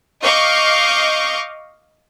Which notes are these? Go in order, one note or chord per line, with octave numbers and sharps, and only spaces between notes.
D#5 F5 C#6 D6 G6